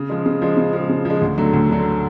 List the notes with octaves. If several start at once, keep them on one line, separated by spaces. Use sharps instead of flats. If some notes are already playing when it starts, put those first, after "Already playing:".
Already playing: C#3
F3 G#3
C#3
F3 G#3
C#3
F3 G#3
C#3
F3 G#3
D2
D3 F#3 A3
D2
D3 F#3 A3